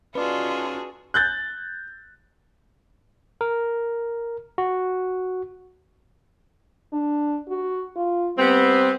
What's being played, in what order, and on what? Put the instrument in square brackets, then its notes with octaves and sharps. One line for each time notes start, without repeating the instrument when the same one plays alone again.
[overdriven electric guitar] C#4 D#4 [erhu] F4 [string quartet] F#4 G#4 A4 [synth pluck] B4 D5
[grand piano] F#6 G6 A6
[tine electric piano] A#4
F#4
[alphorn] D4
F#4
F4
[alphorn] G3 [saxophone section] B3 C4